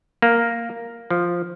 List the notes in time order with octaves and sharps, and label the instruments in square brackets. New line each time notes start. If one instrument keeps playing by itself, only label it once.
[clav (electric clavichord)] A#3
F3